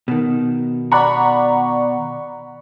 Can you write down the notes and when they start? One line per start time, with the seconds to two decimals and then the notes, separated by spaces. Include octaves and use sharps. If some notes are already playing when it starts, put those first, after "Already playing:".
0.08 B2 D#3
0.92 D5 F#5 A#5 B5 C#6